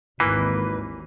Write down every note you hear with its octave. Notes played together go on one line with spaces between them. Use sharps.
G#1 D#2 E3 A#3 B4